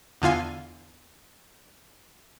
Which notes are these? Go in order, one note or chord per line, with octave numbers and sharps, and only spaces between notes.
E2 D3 F4 F5 G#5